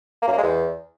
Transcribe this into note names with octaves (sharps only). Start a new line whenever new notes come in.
A#3
F#2
A#3
G#3
E2